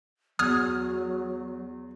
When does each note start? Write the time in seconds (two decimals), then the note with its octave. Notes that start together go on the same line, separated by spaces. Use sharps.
0.39 E2 F#3 D#6 F6 G#6